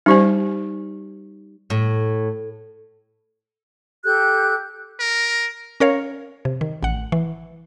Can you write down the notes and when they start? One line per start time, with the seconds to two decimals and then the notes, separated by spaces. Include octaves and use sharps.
0.06 G3 D#4 G4 C5 D5 G#5
1.70 A2
4.04 G4 A4 F#6 G6
4.99 A#4
5.80 C#4 A#4 C#5 F5
6.45 C3
6.61 D#3
6.83 A1 F#5
7.12 E3